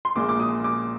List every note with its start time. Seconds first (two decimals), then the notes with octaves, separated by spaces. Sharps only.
0.05 C6
0.16 A#1 A#2 G#3 D6
0.29 D6
0.40 D#6
0.64 D6